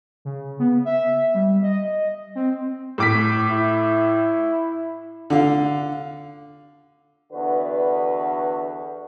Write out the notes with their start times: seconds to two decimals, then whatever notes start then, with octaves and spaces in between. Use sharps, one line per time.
0.25 C#3
0.60 B3
0.85 E5
1.34 G3
1.63 D#5
2.35 C4
2.98 A2 D6 B6
3.50 E4
5.30 D3 F5
7.33 E2 D3 F#4 B4